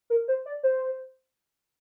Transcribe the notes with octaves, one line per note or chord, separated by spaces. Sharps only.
A#4
C5
D5
C5